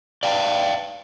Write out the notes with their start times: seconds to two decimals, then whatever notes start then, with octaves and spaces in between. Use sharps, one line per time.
0.23 D5 F5 G5